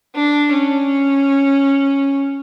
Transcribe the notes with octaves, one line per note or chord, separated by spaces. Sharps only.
D4
C#4